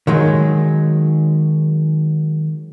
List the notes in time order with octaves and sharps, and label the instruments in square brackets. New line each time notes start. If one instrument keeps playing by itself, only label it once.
[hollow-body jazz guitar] D#3 F#3 G#3